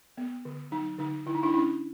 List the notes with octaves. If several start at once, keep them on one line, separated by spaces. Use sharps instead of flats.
B3
D3
F#3 D#4
D3 D#4
D3 E4
D#4
D4 E4
C#4 D4 E4